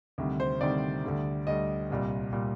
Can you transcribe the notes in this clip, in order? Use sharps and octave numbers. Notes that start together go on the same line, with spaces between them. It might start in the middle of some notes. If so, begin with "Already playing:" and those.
D2 C3 D#3 G3
C5
D2 C3 D#3 G3 D5
D2 D3 G3
D2 D3 G3 D#5
C2 A#2 G3
A#2 G3